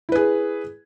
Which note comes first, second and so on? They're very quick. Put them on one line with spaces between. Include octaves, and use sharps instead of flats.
E4 B4 G#4